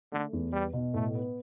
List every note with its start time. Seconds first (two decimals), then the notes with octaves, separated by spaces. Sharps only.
0.12 D3 A3
0.33 E2
0.53 G3 B3
0.73 B2
0.94 A2 A3
1.15 B3